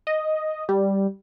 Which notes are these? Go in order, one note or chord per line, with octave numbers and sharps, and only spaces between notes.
D#5
G3